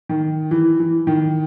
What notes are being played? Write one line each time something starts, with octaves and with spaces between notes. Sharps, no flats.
D#3
E3
E3
D#3